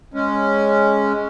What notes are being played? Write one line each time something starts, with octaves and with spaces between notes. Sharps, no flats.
G#3 C#4